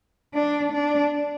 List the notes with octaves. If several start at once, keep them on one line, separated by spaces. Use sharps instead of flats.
D4
D4